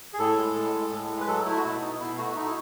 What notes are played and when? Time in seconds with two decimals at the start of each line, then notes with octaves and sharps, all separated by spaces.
0.14 G#4
0.19 A2 A4
0.38 G#3
0.55 A2
0.73 G#3
0.91 A2
1.09 G#3
1.20 B4
1.28 F#3 A4
1.45 A3 E4
1.57 F#4
1.64 B2 E4
1.81 B2 D#4
2.00 B2 E4
2.18 A3 F#4
2.35 A3 D#4
2.45 E4